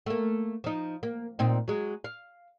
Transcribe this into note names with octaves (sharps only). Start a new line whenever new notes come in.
A3 A#3
F3 D#4
A#3
A#2 C4 D#4
F#3 G#3
F5